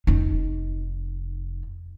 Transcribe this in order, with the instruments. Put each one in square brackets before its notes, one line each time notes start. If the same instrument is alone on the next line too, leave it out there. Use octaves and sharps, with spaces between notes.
[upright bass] F1 D#4